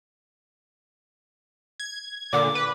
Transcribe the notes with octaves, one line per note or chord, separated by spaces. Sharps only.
G#6
A#2 D3 D6
B4